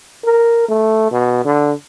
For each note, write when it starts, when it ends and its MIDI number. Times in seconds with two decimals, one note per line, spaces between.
0.24 0.64 70
0.69 1.08 57
1.11 1.41 47
1.45 1.72 50